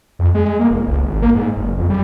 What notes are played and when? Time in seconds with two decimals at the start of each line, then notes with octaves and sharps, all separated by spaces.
0.19 F2
0.34 G#3
0.59 A#3
0.70 F1
0.87 C#2
1.03 G#1
1.22 A#3
1.35 G#2
1.56 F#1
1.78 F2
1.90 G3